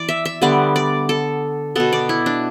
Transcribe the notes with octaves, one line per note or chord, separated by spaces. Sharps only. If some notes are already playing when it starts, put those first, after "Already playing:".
Already playing: E3 D5
E5
E5
D3 G3 B3 D5
D5
A4
B2 B3 A4
D5
E4
D4